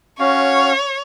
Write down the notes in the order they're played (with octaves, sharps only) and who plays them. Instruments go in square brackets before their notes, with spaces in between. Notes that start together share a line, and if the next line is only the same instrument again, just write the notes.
[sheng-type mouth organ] C#4 F5 [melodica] F#4 [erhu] C#5